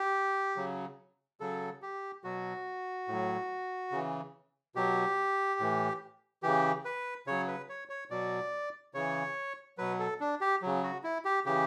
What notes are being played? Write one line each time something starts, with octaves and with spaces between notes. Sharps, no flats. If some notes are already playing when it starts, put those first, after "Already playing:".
Already playing: G4
C#3 F#3
C#3 F#3 A4
G4
B2 F#3 F#4
A2 F#3
C#3 E3
B2 F#3 G4
A2 E3
C#3 E3 G4
B4
C#3 F#3 C#5
B4
C#5
C#5
B2 F#3 D5
C#3 E3 C#5
B2 F#3 B4
A4
D4
G4
C#3 F#3
F#4
E4
G4
C#3 E3 G4